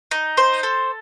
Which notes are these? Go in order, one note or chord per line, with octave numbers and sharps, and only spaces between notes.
D#4
C5
A4